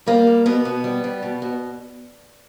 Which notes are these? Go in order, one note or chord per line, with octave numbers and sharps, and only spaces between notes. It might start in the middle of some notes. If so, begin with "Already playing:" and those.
G3 A#3
G3
B2 B3
B2
G3
G3
B2
B2